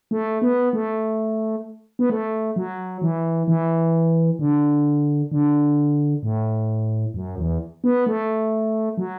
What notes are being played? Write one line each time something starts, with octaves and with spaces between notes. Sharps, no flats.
A3
B3
A3
B3
A3
F#3
E3
E3
D3
D3
A2
F#2
E2
B3
A3
F#3